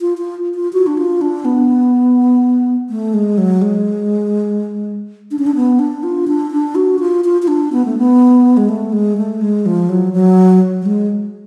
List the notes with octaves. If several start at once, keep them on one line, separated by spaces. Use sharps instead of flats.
F4
F4
F4
F#4
D4
F4
D4
B3
A3
G#3
F#3
G#3
D4
C#4
D4
B3
D4
F4
D4
D4
F#4
F4
F4
F4
D4
B3
A3
B3
G#3
A3
G#3
A3
G#3
F3
F#3
F#3
F#3
G#3